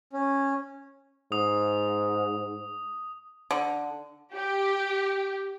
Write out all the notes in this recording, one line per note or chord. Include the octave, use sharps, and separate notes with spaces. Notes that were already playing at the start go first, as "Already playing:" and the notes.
C#4
G#2 D#6
D3
G4